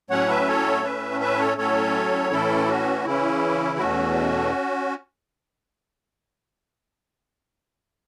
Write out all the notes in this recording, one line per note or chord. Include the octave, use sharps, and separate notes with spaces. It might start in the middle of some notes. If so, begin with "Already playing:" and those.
A2 F#3 A3 C#4 C#5 F#5
B4 E5
A4 C#5
A2 A3 C#4 B4 E5
B4 E5
A4 C#5
A2 F#3 A3 C#4 A4 C#5
A2 E3 A3 C#4 E4 A4
C#4 F#4
C#3 E3 C#4 E4
E2 B2 A3 C#4 F#4